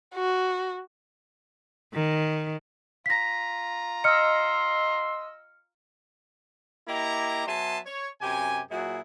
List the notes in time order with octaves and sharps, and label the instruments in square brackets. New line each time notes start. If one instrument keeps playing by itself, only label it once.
[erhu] F#4
[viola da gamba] D#3
[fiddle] F4 A#5 [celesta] A#6 B6
[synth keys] D#5 E6 [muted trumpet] C6 [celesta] F6 C#7
[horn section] A#3 E4 G4 D#5 A#5
F#3 B3 E5 G#5 A5 C6
C#5
F#2 C3 G4 G5 G#5
A#2 F#3 E4 F#4 G#4